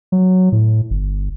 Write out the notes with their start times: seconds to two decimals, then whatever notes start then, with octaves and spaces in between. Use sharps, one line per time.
0.12 F#3
0.52 A2
0.91 G1